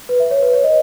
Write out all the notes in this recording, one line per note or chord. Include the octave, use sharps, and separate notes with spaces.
B4
E5
C#5
B4
C#5
D#5